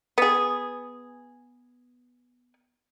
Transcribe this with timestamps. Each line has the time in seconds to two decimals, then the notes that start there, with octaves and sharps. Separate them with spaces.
0.18 B3 G#4